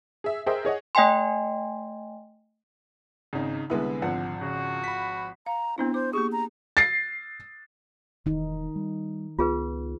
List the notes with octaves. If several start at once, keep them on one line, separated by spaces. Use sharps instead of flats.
G#4 E5
G#4 A#4 C5 D#5 E5 G5
G#4 C#5 D#5 F#5
A3 D#5 G5 G#5 C6
G#1 C#3 D#4
C2 D3 G#3 B3 E4
G#1 F3 F#5
C#3 F#4
B5 B6
F5 A#5
B3 C4 D4 E4
C5 D6
A#3 G4 G#4 C#6
A#5
A6 C7
E1 E2 D#3 D#4
G3
C#2 B3 F4 G#4 B4